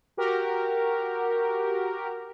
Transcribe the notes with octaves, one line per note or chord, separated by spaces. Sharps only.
F#4 G4 A#4